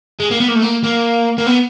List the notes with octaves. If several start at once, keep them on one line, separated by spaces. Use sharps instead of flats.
G#3
A#3
B3
A#3
A3
A#3
A#3
A#3
B3